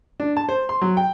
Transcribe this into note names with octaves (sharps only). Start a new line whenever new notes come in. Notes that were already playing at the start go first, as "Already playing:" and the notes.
D4
A5
C5
C6
F#3
G5